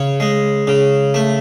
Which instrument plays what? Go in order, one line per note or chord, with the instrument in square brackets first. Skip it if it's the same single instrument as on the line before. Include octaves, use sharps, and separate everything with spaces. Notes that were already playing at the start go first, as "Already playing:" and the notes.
Already playing: [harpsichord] C#3 C#5
G#3
C#3
A3